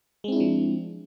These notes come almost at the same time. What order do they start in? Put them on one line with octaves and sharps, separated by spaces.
G#3 C4 E4 D4 F3